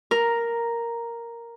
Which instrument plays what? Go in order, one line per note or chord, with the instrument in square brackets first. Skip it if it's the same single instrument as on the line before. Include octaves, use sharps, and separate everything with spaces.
[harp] A#4